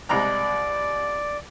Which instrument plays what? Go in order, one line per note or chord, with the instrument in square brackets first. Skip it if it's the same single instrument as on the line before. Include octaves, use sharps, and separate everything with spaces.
[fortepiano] C2 G#3 A#5 [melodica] D5